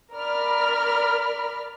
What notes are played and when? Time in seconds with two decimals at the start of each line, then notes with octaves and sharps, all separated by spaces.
0.14 A#4 D5 B5 F6